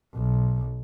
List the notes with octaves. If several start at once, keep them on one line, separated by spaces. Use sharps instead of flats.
B1